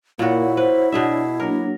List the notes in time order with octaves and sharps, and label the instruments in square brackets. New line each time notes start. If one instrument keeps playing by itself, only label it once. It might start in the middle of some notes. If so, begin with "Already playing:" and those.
[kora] A#2 F#4 [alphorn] A#3 [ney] E4 [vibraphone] C#5 F#5
[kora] B4 [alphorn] C5
[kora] B2 G#4 E5 [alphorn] D4
[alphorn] F#3 [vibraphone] A#3 D4 F#4 [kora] A#4